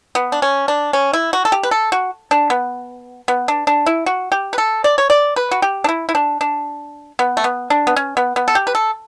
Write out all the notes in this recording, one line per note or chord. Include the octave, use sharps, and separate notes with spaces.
B3
D4
C#4
D4
C#4
E4
F#4
A4
G4
B4
A4
F#4
D4
B3
B3
D4
D4
E4
F#4
G4
B4
A4
D5
C#5
D5
B4
F#4
G4
D4
E4
E4
D4
D4
B3
A3
B3
D4
B3
C#4
B3
B3
A4
G4
B4
A4